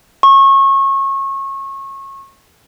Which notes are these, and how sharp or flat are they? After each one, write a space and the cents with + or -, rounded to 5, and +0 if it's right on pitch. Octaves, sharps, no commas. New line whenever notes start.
C#6 -25